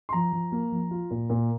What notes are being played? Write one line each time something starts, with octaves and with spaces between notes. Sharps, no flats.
C6
F3 A#5
F3
A#3
F3
F4
A#2
A#2